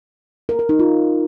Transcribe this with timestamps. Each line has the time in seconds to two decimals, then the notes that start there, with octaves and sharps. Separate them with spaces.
0.49 A#4
0.59 A#4
0.69 D#4
0.79 F4